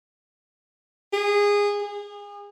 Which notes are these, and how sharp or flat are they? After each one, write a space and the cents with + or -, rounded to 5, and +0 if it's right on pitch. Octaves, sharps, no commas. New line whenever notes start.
G#4 -20
G#4 -35